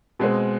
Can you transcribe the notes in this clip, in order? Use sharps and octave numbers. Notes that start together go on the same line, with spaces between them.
B2 G#3 C4 G#4